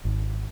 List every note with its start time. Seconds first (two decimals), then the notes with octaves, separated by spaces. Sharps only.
0.05 G#1